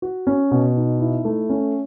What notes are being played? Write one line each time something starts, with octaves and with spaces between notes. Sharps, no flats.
F#4
C#4
B2
D#4
E4
A3
C#4